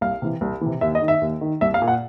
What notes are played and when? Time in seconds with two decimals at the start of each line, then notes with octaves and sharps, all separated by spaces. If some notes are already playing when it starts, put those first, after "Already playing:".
0.01 C2 F5
0.22 C3 E3
0.41 C2
0.61 C3 E3
0.81 D#2 E5
0.95 D#5
1.02 D#3
1.08 E5
1.21 D#2
1.41 D#3
1.61 C2 E5
1.74 F5
1.82 A#2
1.88 F#5